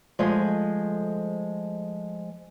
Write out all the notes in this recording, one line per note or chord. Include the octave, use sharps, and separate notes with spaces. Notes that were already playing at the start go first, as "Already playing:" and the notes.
F3 G#3 A3 D#5